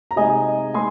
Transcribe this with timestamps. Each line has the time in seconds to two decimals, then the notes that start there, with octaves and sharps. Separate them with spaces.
0.11 A#5
0.16 C3 G#3 D#4 D#5 G#5
0.74 G#3 D#4 G#5 C6